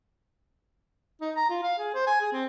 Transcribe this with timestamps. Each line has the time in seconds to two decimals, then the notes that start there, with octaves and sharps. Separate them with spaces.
1.21 D#4
1.36 A#5
1.50 F4
1.63 F5
1.79 G#4
1.94 C5
2.07 G#5
2.21 G#4
2.32 C4